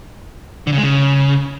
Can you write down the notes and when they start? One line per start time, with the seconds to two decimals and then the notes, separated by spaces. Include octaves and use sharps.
0.67 D3
0.72 C#3
0.78 G#3
0.83 C#3